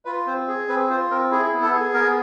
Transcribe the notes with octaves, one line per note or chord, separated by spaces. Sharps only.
F4 B4
C4 C5
G#4
C4 B4
F4 C5
C4 A#4
E4 G#4
B3
A4
G#4
B3 A#4